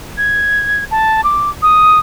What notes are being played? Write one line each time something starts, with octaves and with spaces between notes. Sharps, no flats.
G#6
A5
D6
D#6